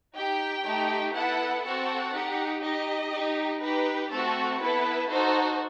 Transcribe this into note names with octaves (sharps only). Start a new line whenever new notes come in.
D#4 G4 G5
A3 D#4 G4
B3 E4 A4 F#5
C4 F#4 A4 F#5
D#4 G4
D#4 G4 D#5
D#4 G4
D#4 G4 B4
A3 C4 F#4 A4
B3 E4 A4 B4
D#4 F#4 A4 C5